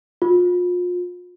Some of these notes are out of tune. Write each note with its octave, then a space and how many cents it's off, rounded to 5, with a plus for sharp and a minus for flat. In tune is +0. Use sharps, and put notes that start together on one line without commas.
F4 +35